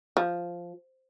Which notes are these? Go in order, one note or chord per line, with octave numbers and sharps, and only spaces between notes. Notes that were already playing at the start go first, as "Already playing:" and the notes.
F3